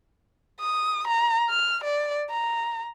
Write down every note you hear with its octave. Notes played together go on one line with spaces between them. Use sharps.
D#6
A#5
F6
D5
A#5